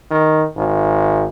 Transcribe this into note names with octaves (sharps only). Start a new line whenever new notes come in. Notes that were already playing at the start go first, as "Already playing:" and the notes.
D#3
G#1